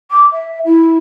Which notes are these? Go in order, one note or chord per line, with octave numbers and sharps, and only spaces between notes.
D6
E5
E4